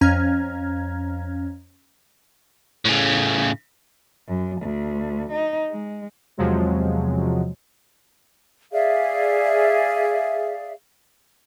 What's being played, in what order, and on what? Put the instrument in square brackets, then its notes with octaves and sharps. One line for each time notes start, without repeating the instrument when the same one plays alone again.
[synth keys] F2 C#4 F5 A#5 F6 G#6
[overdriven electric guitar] A2 C#3
[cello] F#2
D2
D#4
G#3
[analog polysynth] E2 C3 F3 F#3 G#3
[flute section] G#4 D5 E5 F5